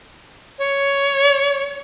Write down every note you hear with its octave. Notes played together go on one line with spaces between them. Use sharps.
C#5